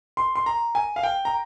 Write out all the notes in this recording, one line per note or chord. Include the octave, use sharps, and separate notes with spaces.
C6
C6
A#5
G#5
F5
G5
A#5